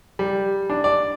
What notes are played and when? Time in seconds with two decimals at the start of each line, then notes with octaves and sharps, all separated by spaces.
0.19 G3
0.70 D4
0.84 D5